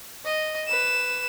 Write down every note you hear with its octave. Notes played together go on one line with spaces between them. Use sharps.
D#5
B4 E7